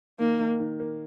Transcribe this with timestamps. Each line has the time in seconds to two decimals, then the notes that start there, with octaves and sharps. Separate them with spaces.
0.19 D#3 A#3
0.40 D#3
0.60 D#3
0.80 A#3